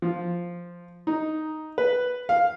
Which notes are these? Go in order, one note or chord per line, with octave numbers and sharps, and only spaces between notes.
F3
D#4
B4
F5